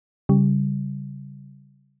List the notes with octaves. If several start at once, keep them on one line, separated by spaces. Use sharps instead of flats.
C#3 G3